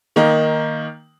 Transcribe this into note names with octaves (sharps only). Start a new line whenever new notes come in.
D#3 A#3 D#4